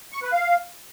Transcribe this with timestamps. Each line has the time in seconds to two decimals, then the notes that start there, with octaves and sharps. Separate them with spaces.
0.12 C#6
0.22 B4
0.32 F5